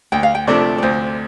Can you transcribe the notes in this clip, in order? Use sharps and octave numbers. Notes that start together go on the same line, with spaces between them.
D2 G5
F5
G5
C3 F3 A3 D4 D5
D5
D2 C5